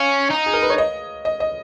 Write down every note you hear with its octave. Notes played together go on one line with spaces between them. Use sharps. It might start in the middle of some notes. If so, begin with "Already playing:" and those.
Already playing: C#4 F5
D#4
G#4
A#4
B4
C#5
D#5
D#5
D#5